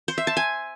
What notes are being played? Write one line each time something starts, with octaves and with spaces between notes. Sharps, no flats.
C5
E5
A5
G#5